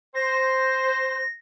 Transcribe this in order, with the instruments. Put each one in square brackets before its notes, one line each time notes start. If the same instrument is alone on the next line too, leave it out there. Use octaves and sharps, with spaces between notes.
[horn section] C5 [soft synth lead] A#6